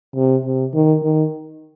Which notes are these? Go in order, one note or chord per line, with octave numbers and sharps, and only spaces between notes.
C3
C3
D#3
D#3